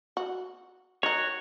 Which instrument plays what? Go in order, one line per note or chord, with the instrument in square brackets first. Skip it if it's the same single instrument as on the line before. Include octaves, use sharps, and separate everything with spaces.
[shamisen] F#4
[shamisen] D#3 D#4 [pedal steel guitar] F#4 C#5